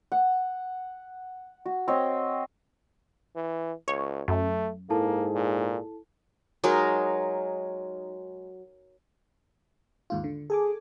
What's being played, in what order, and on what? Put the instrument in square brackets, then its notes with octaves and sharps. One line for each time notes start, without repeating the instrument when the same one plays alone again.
[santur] F#5
F#4
C4 C#5 D#5
[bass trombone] E3
[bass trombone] C#2 [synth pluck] C#5
[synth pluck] F#2 [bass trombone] A3
[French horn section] G#2 G#4 [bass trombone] A#3 [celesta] E4 A4 A5
[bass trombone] A#2
[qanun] F#3 G#3 D#4 A#4
[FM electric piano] D#2 G#2 F4
D3
[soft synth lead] G#4 [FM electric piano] A4 G#5 D6